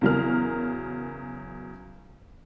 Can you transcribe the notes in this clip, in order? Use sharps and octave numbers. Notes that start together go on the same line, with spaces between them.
E2 C#3 F#3 A#4 F6